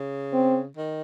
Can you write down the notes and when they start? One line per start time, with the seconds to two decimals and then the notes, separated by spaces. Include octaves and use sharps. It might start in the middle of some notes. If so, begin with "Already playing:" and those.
Already playing: C#3
0.33 C4
0.77 D#3